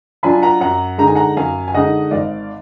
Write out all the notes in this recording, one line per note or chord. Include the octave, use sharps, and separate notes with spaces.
F#3 D4 F4 G#5 B5
F#5 A#5
F#2 F#5 A#5
D3 G#3 D#4 A#5
G#5
F#5 A#5
F#2 F5 G#5
G#5
D3 G#3 D#4 D#5 F#5
G#1 D5 F5